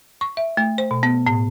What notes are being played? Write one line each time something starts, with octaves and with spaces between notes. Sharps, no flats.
C#6
E5
A3
C5
B2
B3
A2